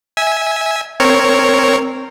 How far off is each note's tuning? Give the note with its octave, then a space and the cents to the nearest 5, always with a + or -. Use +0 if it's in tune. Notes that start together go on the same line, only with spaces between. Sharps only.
E5 -20 G#5 +0 E6 -20
C4 +0 A#4 -10 C#5 +0